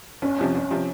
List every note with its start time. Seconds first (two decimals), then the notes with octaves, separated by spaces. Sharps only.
0.22 G1 C#4
0.38 F2 C3 F3 C4
0.55 G1
0.71 C3 F3 C4